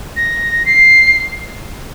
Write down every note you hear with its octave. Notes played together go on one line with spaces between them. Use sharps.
A#6
C7